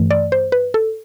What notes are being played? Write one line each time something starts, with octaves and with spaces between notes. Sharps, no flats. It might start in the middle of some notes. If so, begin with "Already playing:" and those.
Already playing: G2 E3 A3
D5
C5
B4
A4